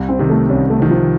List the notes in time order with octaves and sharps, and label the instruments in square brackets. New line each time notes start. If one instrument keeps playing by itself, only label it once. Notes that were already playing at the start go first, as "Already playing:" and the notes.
Already playing: [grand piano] C2
[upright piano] C4
[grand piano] C3 D#3
[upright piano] A3
[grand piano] C2 [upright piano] C#4
[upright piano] A3
[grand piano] C3 D#3
[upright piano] F3